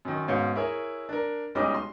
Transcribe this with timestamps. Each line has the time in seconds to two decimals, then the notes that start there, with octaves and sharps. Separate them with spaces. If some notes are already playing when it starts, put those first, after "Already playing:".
0.05 F#2 D#3
0.28 G#2 B2 C#4 F5 G6 C#7
0.55 E4 G#4 A#4 C#5 E5
1.09 D4 A#4
1.55 B1 G3 G#3 C#4 D#4 D6
1.74 C6